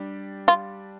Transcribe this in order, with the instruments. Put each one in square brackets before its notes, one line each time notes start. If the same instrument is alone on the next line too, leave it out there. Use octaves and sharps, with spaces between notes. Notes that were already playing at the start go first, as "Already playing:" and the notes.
Already playing: [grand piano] G3 D4 G4
[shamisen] F4